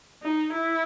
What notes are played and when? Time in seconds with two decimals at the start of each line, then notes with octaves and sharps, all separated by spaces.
0.23 D#4
0.53 E4